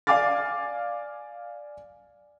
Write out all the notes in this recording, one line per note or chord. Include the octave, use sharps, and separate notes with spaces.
D5 F5 G#5 D6 F6 A6